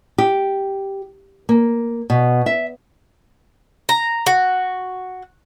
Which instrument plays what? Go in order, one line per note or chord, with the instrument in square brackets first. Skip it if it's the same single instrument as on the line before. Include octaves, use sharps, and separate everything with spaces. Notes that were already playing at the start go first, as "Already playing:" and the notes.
[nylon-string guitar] G4
A#3
B2
E5
[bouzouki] A#5
F#4